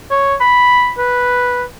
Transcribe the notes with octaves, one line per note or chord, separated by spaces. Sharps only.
C#5
B5
B4